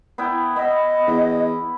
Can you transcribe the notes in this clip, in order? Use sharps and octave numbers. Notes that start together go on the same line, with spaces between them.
B3 E4 G5
B3 D#5 E5
E2